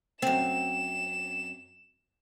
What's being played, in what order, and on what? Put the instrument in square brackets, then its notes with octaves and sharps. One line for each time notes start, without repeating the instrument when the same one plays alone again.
[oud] F#2 C4 [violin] E7